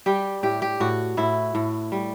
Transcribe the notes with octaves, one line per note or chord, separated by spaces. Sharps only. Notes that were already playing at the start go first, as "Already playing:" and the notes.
G3 G4
A2 G4
G4
A2 F#4
A2 E4
A2
G3